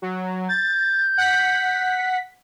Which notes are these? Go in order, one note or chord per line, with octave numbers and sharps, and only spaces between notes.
F#3
G6 A6
F#5 B6